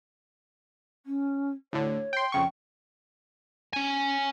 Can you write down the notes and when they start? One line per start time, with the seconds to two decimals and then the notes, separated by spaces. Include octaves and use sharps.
1.06 C#4
1.73 D2 A2 D3 C#5
2.13 G5 C6
2.32 F2 C#3 G5 C#6
3.73 C#4 G#5